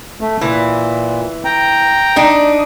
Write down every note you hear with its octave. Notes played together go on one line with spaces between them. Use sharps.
A3
A#2 E3
G5 A#5
D4 D#4